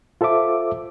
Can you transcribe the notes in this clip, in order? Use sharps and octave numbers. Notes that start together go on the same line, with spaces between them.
F4 A4 C5 E5 D6